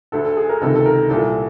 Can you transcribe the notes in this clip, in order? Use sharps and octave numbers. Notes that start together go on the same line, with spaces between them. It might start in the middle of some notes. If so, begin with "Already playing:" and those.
D2 D3 A4
A4
G#4
A#4
C#2 C3 D#3 A4
A4
A#4
C2 A#2 A4